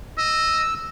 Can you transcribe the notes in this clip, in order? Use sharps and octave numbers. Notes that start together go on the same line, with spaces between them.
D#5 E6